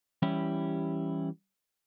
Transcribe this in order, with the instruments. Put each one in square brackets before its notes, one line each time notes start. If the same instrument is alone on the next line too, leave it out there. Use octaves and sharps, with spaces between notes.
[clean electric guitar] E3 G3 C#4 E4 G4